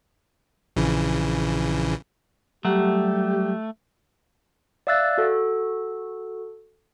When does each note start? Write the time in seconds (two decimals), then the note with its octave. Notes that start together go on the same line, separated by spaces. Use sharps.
0.76 A#1 C#3 E3
2.65 F#3 G3 A3 G4 F#5
4.87 D5 E5 F5 E6 F#6 A6
5.18 F#4 A4